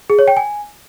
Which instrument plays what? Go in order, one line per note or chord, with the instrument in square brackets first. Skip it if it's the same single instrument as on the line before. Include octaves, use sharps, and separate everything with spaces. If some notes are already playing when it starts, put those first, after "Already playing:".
[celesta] G#4
C#5
G5
G#5